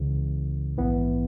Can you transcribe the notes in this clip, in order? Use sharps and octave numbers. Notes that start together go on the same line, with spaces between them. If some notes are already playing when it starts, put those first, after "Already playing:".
Already playing: C#2 C#3 E3
A#1 G#2 E3 B3